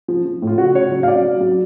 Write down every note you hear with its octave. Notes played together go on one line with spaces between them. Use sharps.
F3
F3
A2
F4
C#3 F#4
C#3 C#5
F#3
F5
F#3 D5
F#3
F#3